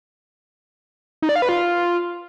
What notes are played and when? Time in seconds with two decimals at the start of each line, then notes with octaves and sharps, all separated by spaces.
1.22 D#4
1.29 D5
1.36 F5
1.42 B4
1.49 F4